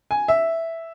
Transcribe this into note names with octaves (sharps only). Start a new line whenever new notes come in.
G#5
E5